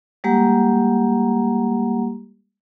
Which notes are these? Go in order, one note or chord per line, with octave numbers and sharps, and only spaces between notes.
G3 G#3 A#3 G4 F#5 A#5